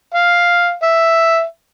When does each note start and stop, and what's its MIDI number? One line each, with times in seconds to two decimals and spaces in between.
0.14 0.74 77
0.83 1.44 76